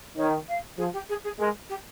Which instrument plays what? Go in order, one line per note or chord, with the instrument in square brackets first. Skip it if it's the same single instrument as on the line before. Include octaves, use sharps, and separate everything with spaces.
[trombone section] D#3 [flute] C#5
[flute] F5
[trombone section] F3 [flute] G#4
[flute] G4
G#4
G#4
[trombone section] G#3 [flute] A#4
[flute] G4